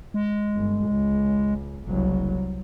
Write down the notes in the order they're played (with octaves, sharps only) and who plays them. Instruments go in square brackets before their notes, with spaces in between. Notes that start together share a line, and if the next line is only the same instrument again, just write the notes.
[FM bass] G#3
[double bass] G1
C#2
[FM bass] F#1 [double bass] C2 F#3